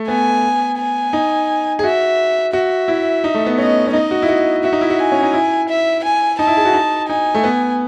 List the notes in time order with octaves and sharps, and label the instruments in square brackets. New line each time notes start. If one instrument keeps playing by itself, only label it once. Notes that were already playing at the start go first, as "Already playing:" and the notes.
Already playing: [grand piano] A3
[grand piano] B3 [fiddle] G#5
[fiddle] G#5
[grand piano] D#4
G#4
[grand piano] F#4 [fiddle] E5
[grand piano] F#4 [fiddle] E5
[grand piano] E4
D#4
A3
B3
[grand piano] C#4 [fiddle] D#5
[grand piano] C#4
[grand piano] D#4 [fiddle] D#5
[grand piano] F#4
E4
F#4
[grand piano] F#4 [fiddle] E5
[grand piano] D#4
E4
F#4
[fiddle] G#5
[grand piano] C#4
D#4
E4
[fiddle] E5
G#5
[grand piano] D#4 [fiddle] A5
[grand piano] E4
G#4
F#4
D#4
[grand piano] D#4 [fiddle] G#5
[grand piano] A3
B3